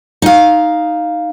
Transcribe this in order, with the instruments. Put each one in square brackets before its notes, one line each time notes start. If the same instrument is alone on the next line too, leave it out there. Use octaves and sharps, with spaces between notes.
[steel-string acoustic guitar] D#4 F5